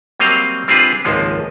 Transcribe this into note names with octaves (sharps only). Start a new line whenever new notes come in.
F#3 G3 A#3 C4 D#5 F5
G3 C4 D4 F4 G#4 B4
G#1 C#2 F3 G#3 A#3